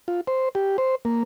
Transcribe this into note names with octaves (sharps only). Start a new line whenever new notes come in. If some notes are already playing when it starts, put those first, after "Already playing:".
F4
C5
G4
C5
A#3